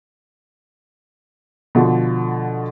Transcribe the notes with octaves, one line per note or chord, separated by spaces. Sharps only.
B2 D3 F3